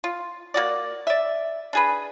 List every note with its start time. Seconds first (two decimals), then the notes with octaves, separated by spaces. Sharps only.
0.04 F4
0.54 A#3 F#4 D5
1.07 D5 E5
1.73 D4 G#4 B4